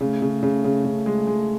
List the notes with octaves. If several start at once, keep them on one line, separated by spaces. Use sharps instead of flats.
C#3 A3
C#3
C#3
C#3
C#3
G#3
G#3